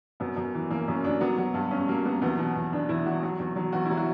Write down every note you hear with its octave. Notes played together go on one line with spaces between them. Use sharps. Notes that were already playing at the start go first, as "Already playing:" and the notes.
F#2 B3
F#2
E3
F#2 A#3
F#2 C#4
F#2 D4
F#3 B3
F#3
G2
G2 C#4
F#3 A#3
F#3 B3
E2 B3
B2
E2
E2 D4
E2 E4
F#3 F#4
F#3 F#4
E2
F#3
E2 F#4
E4
F#3
F#4